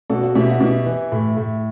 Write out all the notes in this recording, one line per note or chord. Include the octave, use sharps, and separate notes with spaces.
B2 F#4 A4
F#4
B2 E4 G4
F#4
B2 E4 G4
E3
A2
A2